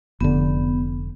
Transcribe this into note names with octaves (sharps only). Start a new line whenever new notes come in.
F1 D3 B3